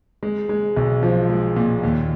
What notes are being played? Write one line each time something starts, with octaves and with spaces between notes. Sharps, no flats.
G#3
G#3
B1
F3
G#3
A#2
D#2